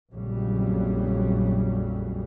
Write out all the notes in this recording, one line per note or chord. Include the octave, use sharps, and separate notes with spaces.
A#1 F2 C#3 F#3 G3